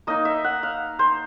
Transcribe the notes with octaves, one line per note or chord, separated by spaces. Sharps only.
A#3 D#4 D#5
E5
F#5
F5
C5